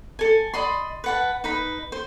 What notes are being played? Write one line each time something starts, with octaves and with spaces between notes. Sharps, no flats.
A4 G#5
D5 D#5 B5 C6
B4 F#5 A5
D#4 B4 B5
C5